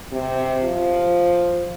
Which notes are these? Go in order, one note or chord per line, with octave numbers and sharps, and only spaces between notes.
C3
F3